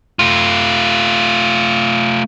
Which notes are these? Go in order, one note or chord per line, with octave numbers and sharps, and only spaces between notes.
A3 F4